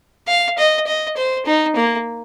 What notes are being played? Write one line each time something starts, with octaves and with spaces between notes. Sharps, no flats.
F5
D#5
D#5
C5
D#4
A#3